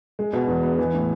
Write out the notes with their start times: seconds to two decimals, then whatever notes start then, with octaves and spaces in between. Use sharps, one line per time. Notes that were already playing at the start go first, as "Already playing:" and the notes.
0.19 G#3
0.33 B2
0.48 E2
0.63 B3
0.78 E3
0.94 A2